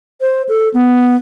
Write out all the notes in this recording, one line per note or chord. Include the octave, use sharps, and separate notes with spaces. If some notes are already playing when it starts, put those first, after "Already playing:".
C5
A4
B3